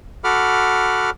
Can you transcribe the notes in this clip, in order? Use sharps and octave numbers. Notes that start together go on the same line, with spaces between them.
F#4 A4 F#5 B5 D6 F6